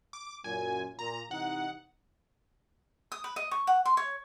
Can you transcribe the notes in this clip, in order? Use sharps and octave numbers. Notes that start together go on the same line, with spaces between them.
D6
F#2 A#2 G#5
A#2 A#5
C3 E3 D#4 F#5
D#6
B4
D#5
C#6
F#5
C6
C#5